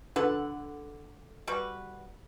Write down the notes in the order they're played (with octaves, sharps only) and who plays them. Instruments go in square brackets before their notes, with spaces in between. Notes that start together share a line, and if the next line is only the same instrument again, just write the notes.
[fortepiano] D3 [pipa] A4 B4 F#5
[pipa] G3 F#4 B4